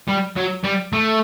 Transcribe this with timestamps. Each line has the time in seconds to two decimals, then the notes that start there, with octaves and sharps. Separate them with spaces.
0.08 G3
0.36 F#3
0.64 G3
0.93 A3